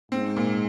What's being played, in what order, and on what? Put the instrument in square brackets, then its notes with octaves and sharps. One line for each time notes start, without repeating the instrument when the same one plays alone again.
[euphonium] G#2 [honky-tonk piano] C4
[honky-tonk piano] A#2